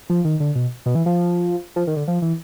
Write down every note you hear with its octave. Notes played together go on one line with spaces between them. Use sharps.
F3
D#3
D3
B2
B2
E3
F3
F3
D#3
D3
F3
E3